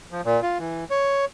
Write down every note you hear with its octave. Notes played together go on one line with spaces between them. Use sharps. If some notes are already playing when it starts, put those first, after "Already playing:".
F3
A#2
F4
E3
C#5